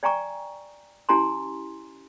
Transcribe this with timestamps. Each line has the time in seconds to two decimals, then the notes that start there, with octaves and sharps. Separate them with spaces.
0.03 D5 G5 G#5 A#5 C#6
1.09 C#4 E4 G4 G#5 A#5 C6